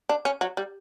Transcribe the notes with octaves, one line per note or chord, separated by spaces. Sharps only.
D4
C#4
F#3
G3